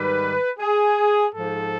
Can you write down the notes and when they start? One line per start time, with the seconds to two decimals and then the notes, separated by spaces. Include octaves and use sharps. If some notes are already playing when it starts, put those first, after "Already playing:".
Already playing: G#2 D#3 G3 B4
0.59 G#4
1.33 G#2 F3 A4